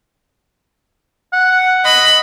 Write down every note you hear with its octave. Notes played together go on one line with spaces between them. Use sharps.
F#5
D#5 B5